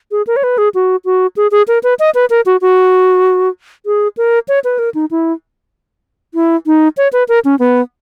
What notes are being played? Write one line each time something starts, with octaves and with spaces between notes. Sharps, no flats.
G#4
A#4
C#5
B4
G#4
F#4
F#4
G#4
G#4
A#4
B4
D#5
B4
A#4
F#4
F#4
G#4
A#4
C#5
B4
A#4
D#4
E4
E4
D#4
C#5
B4
A#4
C#4
B3